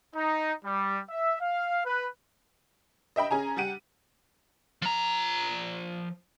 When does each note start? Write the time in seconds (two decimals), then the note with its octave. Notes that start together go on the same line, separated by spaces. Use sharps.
0.15 D#4
0.65 G3
1.09 E5
1.41 F5
1.85 B4
3.16 D#5 E5 G5 B5
3.31 C#4 G#4 G#5 A#5
3.57 G3 G4 F#5 D#7
4.82 F3 A#5